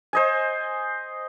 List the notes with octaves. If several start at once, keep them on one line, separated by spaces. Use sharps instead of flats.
C5 D#5 G#5